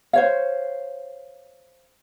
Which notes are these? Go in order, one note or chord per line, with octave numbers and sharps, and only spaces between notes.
C5 C#5 F5